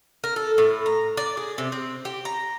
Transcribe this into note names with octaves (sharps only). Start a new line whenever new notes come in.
A#4
A4
A2
A#5
D5
G#4
C3
C4
G4
A#5